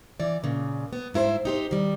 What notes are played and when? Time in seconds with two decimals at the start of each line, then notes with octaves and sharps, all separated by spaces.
0.20 E3 D5
0.44 A#2 C#3
0.93 B3
1.14 G#2 E4 A#4 C5
1.45 D#4 G4 C5
1.71 D#3 G3